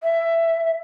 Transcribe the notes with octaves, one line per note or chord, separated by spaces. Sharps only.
E5